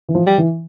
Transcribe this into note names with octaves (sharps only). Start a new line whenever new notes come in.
E3
F3
G3
E3